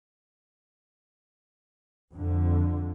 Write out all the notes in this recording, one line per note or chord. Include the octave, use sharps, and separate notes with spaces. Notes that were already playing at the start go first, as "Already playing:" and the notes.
F2 D3